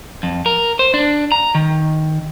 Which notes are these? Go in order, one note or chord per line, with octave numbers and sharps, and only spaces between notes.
F2
A#4
C5
D4
A#5
D#3